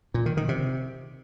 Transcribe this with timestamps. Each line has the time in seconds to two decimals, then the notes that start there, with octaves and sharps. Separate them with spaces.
0.14 A#2
0.26 D#3
0.37 D#3
0.49 C3